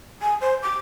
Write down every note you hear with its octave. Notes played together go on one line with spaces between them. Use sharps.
G#5
C5
D6